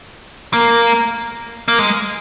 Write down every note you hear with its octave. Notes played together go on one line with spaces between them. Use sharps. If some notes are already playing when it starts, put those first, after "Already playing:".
A#3
A#3
G#3